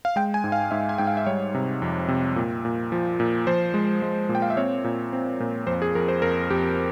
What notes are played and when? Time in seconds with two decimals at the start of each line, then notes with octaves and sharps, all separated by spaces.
0.05 F5
0.16 G#3 G5
0.34 G#5
0.44 G#2
0.52 F5
0.71 G#2 E5
0.89 G#5
0.98 G#2 G5
1.07 F5
1.17 E5
1.26 G3 C#5
1.54 C3
1.82 F2
2.08 C3
2.36 A#2
2.65 A#2
2.92 F3
3.20 A#2
3.47 F3 C5
3.74 G#3
4.02 G#3
4.29 A#2
4.35 G5
4.42 F5
4.50 E5
4.57 C4 C#5
4.84 A#2
5.13 C4
5.40 A#2
5.67 F2 C5
5.82 G#4
5.95 F2 A#4
6.08 C5
6.22 F2 A#4
6.50 F2 G4